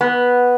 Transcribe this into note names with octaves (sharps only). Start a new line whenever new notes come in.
B3